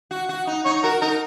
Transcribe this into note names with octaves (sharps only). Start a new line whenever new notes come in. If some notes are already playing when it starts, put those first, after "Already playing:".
F#4
F#4
D#4
D#4 C#5
F#4 A#4
D#4 A#4